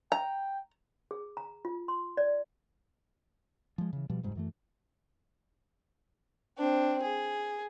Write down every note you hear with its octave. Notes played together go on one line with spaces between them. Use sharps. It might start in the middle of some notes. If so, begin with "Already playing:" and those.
G5 A#5
G#4
A#5
F4
C6
D5
F3 G#3
C#3 E3
B2 F3 G3
F1 G#2 G3
F#2 E3 A3
C4 D4
G#4